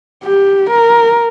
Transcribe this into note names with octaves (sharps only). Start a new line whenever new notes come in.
G4
A#4